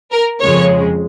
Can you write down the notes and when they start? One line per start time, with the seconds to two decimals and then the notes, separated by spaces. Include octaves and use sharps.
0.12 A#4
0.41 F2 C#3 F3 G#3 C#5